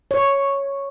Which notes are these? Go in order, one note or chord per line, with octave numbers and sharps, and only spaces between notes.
C#5